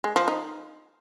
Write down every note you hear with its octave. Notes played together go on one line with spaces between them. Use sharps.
G#3
F3
D#4